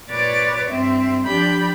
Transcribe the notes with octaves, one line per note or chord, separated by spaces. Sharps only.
A#2 B4 C#5 D5 D6 A6
G2 C4 E5
F3 D4 G4 B5 G6